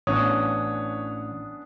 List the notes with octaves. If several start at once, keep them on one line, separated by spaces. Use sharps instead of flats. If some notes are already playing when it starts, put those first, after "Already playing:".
A1 B3 C#4 D4 C#5 D#6